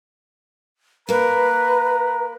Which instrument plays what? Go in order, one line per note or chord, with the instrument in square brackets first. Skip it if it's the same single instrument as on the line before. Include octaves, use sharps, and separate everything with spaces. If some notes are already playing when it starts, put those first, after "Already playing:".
[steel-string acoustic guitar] A#3 A#4 [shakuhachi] B4 [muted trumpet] A#5